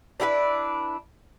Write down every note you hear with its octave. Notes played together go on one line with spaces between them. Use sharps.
D4 E4 G4 B4